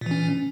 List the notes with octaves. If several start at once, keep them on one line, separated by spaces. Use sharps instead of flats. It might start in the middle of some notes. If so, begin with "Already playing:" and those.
A#2 E3 C#4